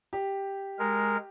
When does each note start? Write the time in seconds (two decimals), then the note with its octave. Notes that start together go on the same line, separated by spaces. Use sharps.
0.13 G4
0.79 G#3 A#4